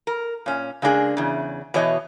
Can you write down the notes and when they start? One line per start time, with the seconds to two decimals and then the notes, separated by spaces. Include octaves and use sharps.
0.07 A#4
0.46 A#2 C#4
0.82 C#3 G#3 A#3 D4 G#4
1.17 E2 C#3
1.74 B2 E3 C#5 D#5